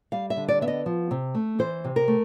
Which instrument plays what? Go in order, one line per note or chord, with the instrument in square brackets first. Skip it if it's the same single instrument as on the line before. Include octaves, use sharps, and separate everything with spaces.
[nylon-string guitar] G3 F5
E5
D3
D5
B3 E5
D#5
F3
C3
A3
E3 C5
C3
A#4
A3